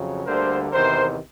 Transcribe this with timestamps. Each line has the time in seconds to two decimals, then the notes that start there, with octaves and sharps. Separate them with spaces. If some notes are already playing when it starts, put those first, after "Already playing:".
Already playing: F2 C#3 F#3
0.26 D2 D3 G3 A#3 A#4 C5
0.72 E2 C3 D#3 A#4 C5